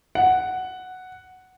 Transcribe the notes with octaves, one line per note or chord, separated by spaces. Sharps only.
F#5